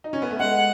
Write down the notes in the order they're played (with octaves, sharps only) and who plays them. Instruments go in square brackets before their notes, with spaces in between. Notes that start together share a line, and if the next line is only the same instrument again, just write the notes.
[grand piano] D#4
C#4
B3
A3
[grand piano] G#3 [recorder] F#5